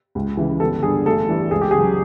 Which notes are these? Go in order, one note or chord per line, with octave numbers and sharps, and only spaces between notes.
C#2
C#3 E3
G1 A4
G2 D3 G3 G#4
A1 A4
G2 E3 G3
C#2 G#4
G4
G#4
C#3 F#3